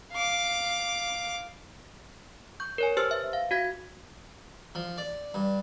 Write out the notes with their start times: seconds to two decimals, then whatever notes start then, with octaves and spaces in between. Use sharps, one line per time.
0.13 F5 D6
2.60 C#6 G6
2.78 A#4 C#5 G#5
2.97 G4 B4 C5 A5 E6 F6
3.11 E5
3.33 F5
3.51 F#4 F5 G#6 B6
4.75 F3
4.98 D5
5.34 G2